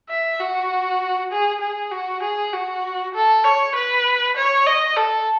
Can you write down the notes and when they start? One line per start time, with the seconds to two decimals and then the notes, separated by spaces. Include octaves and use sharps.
0.09 E5
0.40 F#4
1.32 G#4
1.61 G#4
1.92 F#4
2.23 G#4
2.53 F#4
3.15 A4
3.44 C#5
3.75 B4
4.36 C#5
4.67 D#5
4.97 A4